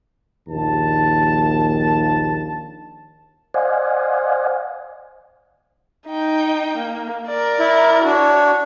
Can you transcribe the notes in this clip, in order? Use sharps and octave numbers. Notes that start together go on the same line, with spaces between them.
A#1 D#2 A5
C5 D5 D#5 F5 F#5 G#5
D#4 G5
A#3
A#4 D5
E4
D4 F#4 C#5